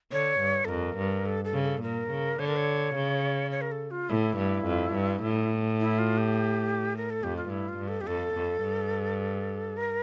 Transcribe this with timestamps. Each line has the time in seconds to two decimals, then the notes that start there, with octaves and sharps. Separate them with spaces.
0.12 D3 C#5
0.41 G2
0.65 A4
0.69 F2 A#4
0.98 G2
1.26 A4
1.45 A4
1.54 C#3
1.64 A4
1.82 A#2 A#4
2.11 C#3
2.39 D3 C#5
2.47 A#4
2.56 C#5
2.96 C#3
3.51 C#5
3.61 A#4
3.72 A4
3.91 F4
4.09 A2 E4
4.38 G2
4.66 F2
4.94 G2
5.23 A2
5.80 E4
5.98 F4
6.18 G4
6.97 A#4
7.10 A4
7.22 F2 G4
7.37 F4
7.50 G2 E4
7.69 F4
7.78 G2
7.88 A4
8.01 G4
8.07 F2 A4
8.35 F2
8.63 G2
9.77 A#4